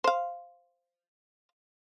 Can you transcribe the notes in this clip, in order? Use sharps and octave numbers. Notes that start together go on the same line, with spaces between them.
C5 F5